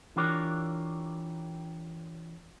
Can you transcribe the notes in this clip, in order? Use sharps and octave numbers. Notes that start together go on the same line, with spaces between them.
E3 D4 F4 G4 A#4 C#5